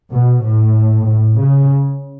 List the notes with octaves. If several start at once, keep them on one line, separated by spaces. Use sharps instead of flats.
B2
A2
A2
C#3